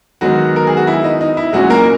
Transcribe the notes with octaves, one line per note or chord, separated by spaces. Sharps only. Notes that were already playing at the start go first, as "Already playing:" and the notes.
D#3 F#3 G#3 B3 F#4
A#4
G#4
F#4
E4
D#4
D#4
E4
A#2 F#3 G#3 C#4 F#4
A#3 A#4